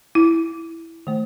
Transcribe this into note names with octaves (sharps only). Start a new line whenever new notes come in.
E4
D#3 A3